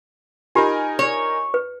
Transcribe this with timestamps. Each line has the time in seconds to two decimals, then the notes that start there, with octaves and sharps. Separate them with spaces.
0.55 D#4 F4 G4 A#4 G#5 B5
0.99 C#5
1.54 B4